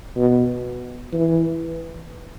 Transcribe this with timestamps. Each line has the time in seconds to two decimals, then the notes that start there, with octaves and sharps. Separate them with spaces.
0.16 B2
1.13 E3